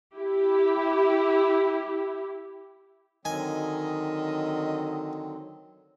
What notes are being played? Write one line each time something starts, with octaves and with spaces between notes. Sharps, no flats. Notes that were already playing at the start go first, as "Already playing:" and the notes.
E4 G4
D3 D#3 F#3 C4 D#5 G#5